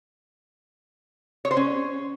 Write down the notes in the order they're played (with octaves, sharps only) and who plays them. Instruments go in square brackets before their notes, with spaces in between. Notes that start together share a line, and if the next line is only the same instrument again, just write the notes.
[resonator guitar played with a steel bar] C#5
C5
C#4